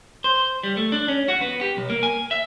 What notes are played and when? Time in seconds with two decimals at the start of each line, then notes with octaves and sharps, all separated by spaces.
0.24 C5
0.63 G3
0.77 A3
0.92 D4
1.08 C#4
1.28 F#4
1.41 B3
1.61 G4
1.77 B1
1.90 A#3
2.03 G#5
2.31 E5